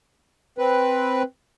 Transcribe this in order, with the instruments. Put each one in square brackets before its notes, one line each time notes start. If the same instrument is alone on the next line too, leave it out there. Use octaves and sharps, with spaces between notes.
[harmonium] C4 B4